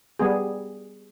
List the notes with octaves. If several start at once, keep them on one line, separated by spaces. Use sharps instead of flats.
G3 B3 G#4